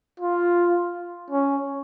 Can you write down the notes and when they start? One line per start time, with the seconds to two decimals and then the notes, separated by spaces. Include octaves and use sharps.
0.20 F4
1.30 C#4